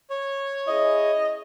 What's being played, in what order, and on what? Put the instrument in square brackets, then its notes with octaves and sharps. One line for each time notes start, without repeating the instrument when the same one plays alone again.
[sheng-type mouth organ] C#5
[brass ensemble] C#4 E4 G#4 [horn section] D#5